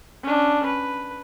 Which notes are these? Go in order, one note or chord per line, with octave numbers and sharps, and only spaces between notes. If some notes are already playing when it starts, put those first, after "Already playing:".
C#4 D4
B4